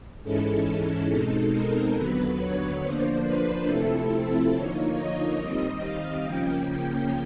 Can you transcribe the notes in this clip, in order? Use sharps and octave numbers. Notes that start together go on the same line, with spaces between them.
G#2 E3 G#3 C#4 E4 A4
B2 G#3 C4 D#4
A#4
D#2 D3 F#3 B3 B4
C#5
D3 F3 A#3 D4 C5
B4
C3 F3 A3 C4 E4 A4
D3 F3 A#3 D#4 C#5
D#5
D#3 G3 C4
F5
C#3 F3 A#3 C#4 G5